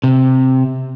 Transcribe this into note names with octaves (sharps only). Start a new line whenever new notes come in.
C3